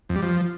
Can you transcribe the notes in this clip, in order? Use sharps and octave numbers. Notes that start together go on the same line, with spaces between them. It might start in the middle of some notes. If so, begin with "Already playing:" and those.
F2
G3
F3